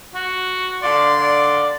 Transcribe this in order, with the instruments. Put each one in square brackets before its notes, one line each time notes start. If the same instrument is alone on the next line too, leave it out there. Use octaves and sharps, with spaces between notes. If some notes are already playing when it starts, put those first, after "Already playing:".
[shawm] F#4
[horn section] D3 F5 C6 [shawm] D5
[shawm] D5